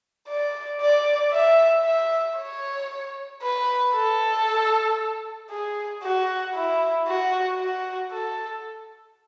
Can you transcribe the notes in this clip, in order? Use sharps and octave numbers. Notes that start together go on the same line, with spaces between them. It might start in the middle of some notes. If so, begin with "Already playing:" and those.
D5
D5
E5
E5
C#5
B4
A4
G#4
F#4
E4
F#4
F#4
A4